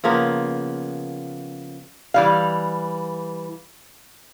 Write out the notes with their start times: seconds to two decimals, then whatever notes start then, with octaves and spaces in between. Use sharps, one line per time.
0.04 C#3 F3 A#3 B3
2.14 E3 G3 F5